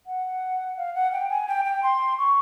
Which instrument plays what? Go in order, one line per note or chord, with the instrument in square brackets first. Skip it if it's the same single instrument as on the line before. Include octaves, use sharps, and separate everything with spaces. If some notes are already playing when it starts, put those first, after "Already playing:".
[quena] F#5
F5
F#5
G5
G#5
G5
G5
C6
C#6